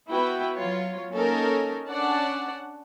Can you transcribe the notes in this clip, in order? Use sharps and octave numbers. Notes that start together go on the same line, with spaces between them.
B3 E4 F#4 B4 G5
F#3 F4 C#5
A#3 C#4 D#4 A4 A#4
C#4 D4 D5 F#5 A5